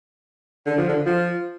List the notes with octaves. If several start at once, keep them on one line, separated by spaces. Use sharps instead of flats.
D3
F3
D3
F3